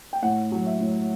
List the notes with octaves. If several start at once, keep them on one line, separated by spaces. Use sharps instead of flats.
G5
A2 F#5
F#3
E5
A2